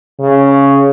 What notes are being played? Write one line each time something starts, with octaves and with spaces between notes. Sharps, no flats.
C#3